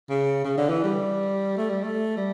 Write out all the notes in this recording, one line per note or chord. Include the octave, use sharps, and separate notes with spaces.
C#3
C#3
D3
E3
G3
A3
G3
A3
G3